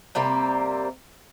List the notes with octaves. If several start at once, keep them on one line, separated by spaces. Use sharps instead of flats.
C3 G3 A#3 C4